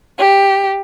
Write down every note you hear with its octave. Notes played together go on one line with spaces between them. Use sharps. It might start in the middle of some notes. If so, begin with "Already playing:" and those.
G4